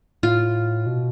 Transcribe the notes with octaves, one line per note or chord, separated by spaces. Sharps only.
A2 F4
B2